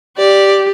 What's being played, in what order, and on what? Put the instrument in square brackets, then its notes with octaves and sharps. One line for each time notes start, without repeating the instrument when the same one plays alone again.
[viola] G4 [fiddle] D5